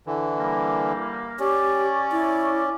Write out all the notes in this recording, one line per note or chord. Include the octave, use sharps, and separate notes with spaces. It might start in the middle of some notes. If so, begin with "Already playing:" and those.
D3 E3
G3 A#3
C#4 G4 C#5 D5
E4